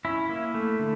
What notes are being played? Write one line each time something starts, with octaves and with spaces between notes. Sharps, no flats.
C#4 E4
A#3
A3
D3